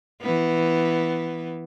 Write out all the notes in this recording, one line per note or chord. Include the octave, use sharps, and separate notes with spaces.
E3 B3